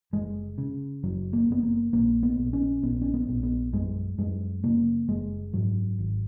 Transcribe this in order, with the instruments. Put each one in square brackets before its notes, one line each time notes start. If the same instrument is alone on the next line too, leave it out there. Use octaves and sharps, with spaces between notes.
[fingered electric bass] F#1 G#3
C#3
F#1 F#3
A#3
F#1 B3
A#3
A#1 A#3
B3
A#1
C#4
A#1 B3
C#4
B3
A#1
B3
F#2 G#3
F#2 G#3
C#3 A#3
F#1 G#3
G#2 F#3
G#1